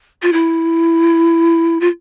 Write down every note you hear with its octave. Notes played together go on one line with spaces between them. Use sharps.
F4
E4
F4